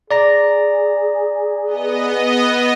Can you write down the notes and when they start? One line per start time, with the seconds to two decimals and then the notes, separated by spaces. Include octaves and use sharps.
0.11 G#4 D5 A#5 A#6
1.65 B3 D#5